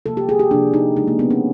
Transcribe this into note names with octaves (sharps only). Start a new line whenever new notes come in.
C3 F3 A#3 A4
G4
G#4
G4
C3 F3 A#3 D4
D#4
C#3 F3 G#3 D#4
A#3
B3
C#4